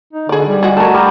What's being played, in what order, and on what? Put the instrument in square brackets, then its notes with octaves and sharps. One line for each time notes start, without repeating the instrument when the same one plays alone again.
[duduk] D#4
[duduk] D3 [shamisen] G#4 D5
[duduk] G3
[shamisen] G#3 F#4 G#4
[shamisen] A3 A#4 [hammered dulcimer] F#4 G#5 A5
[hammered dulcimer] G3 A#5